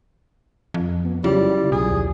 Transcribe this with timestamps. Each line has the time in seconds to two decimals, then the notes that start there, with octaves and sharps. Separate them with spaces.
0.74 F2
1.05 B3
1.24 C#3 F#3 G3 E4 F4
1.72 B1 G#4
1.91 D#2 F3